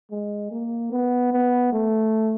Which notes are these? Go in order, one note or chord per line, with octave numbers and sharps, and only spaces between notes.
G#3
A#3
B3
B3
A3